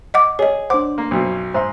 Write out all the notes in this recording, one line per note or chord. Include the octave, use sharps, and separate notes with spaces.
D#5 F#5 D6
G#4 C#5 D#5
D4 C5 F#5 D6
A#3
B1 F#2 B2
G#2 C5 E5 C6